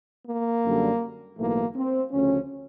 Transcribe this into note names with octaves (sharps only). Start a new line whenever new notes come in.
A#3
F#2 D3 G3
B1 A2 E3 A3 A#3
C4
D2 C#3 F3 C#4